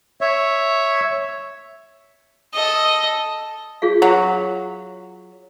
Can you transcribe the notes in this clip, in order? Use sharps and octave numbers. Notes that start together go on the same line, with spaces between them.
C#5 E5
A4 D#5
F4 G#4 F5
F#3 F5